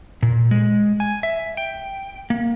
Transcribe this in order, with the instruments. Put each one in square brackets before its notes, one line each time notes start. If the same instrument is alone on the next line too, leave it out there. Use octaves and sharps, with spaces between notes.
[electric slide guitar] A#2
G#3
G#5
E5
G5
A#3